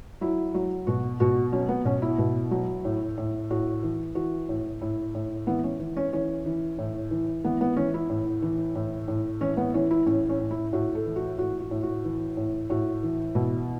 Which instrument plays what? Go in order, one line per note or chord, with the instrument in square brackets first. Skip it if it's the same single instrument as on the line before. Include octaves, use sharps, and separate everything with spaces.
[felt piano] F#3 E4
F#3
B2 F#4
B2 F#4
F#3 C#4
B3
B2 C#4
E4
B2
F#3
A2
A2
A2 F#4
E3
E3 F#4
A2
A2 E4
A2
E3 B3
C#4
E3
C#4
E3 C#4
E3
A2
E3
E3 B3
B3
E3 C#4
E4
A2
E3
A2
A2
E3 C#4
B3
E3 C#4
E4
A2 C#4
C#4
A2
E4
A2 F#4
A4
E3
F#4
A2 F#4
F#4
A2
F#4
E3
A2
A2 F#4
E3
B2 E4